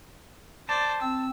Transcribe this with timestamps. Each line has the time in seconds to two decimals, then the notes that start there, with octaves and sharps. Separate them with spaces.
0.69 C5 D5 A5
1.02 C4 E6